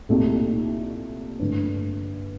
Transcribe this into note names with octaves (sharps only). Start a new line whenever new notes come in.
C2 A#2 A3 D#4 G4
G2 D3 A3